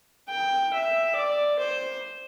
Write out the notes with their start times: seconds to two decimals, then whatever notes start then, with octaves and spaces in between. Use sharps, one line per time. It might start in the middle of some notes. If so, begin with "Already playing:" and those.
0.29 G5
0.73 E5
1.16 D5
1.59 C5